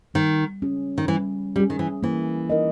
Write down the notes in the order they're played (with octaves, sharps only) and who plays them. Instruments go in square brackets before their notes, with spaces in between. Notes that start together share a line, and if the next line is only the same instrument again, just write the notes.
[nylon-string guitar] D#3 [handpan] G3
[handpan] C#4 G#4
[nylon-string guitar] D#3
[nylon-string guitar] E3 [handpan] G3
[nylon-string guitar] G3 [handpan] C#4 G#4
[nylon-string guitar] D#3
E3
[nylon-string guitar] E3 [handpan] A#3
[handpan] D#4 A#4 D#5